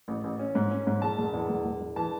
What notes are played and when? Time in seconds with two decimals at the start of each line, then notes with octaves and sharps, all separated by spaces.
0.08 A1
0.24 A1
0.39 C#4
0.55 G#2
0.71 C#4
0.87 G#2
1.02 E1 A5
1.18 E1
1.33 E2
1.49 E1
1.65 E1
1.81 E1
1.96 E3 A5